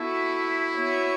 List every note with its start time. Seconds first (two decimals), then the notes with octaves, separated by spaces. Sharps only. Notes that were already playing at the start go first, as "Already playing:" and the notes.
Already playing: B3 E4 F#4 A4 E5
0.76 B3 F#4 C#5 E5